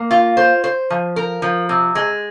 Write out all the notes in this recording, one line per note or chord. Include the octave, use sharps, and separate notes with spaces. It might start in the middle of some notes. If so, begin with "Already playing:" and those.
Already playing: A#3
F4
C5
C5
F3
A#4
F3
C3
G#3